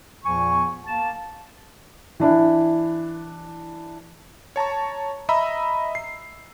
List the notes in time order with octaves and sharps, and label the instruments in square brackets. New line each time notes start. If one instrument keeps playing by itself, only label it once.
[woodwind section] E2 A#2 F3 B3 G#5 C#6
A#3 A5
[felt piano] E3 D4 E4
[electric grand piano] C#5 A5 A#5 C#6
D#5 E5 A#5 B5 E6
C7